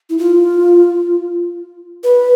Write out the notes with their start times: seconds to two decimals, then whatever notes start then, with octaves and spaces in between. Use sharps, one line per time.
0.09 E4
0.18 F4
2.04 B4